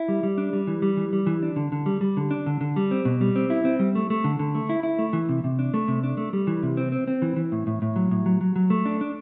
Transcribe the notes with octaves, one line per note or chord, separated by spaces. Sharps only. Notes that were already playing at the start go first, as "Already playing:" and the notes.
Already playing: E4
G3
G3
D4
G3
E3
G3
E3
G3
E3
D4
D3
D3
G3
G3
D3
D4
D3
D3
G3
C4
B2
G3
C4
E4
C4
G3
A3
A3
D3
D3
A3
E4
E4
A3
E3
C3
C3
D4
A3
C3
D4
A3
G3
E3
C3
C4
C4
C4
E3
E3
A2
A2
A2
F#3
A2
F#3
F#3
F#3
A3
D4
D4